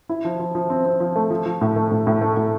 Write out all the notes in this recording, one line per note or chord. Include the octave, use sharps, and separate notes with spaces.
E4
F3
F3
F3
C4
C4
F3
A3
F3
F3
A2
A3
A2
A2
A3
A2